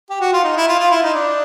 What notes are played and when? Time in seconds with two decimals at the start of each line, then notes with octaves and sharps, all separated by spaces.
0.10 G4
0.21 F#4
0.33 F4
0.44 D#4
0.56 E4
0.68 F4
0.79 F4
0.90 E4
1.03 D#4
1.14 D4